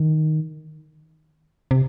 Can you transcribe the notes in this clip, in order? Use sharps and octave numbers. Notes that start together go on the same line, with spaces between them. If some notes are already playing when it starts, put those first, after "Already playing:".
Already playing: D#3
C3